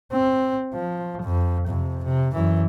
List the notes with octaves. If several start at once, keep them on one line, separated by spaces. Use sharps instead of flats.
C4
F3
F2
F2 C3
C3
F#2 E3